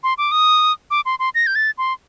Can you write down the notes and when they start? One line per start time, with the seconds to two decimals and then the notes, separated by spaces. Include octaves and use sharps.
0.03 C6
0.18 D6
0.32 D#6
0.91 D6
1.06 C6
1.19 C6
1.35 A#6
1.47 G6
1.55 A6
1.78 C6